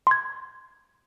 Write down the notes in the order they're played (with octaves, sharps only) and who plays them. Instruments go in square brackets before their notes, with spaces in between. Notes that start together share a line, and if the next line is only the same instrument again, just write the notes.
[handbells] C6 G#6